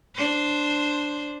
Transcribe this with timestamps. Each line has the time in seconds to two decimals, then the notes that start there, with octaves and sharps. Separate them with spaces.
0.15 D4 C5